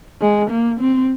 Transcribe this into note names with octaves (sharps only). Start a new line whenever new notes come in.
G#3
A#3
C4